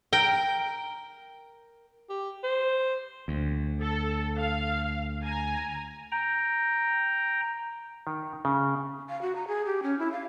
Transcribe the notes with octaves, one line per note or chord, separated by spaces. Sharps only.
A#4 G5
G4
C5
D2
A4
F5
G#5 A#5
G5 A#5
D#3
C#3
F5
F#4
A#5
G#4
G4
C#4
E4
F5